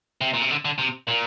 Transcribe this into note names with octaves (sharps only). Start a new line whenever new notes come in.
C3
A#2
C3
D3
D3
C3
A#2